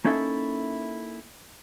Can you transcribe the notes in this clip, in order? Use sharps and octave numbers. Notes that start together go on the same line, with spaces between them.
A#3 C#4 D#4 E4 A4 E5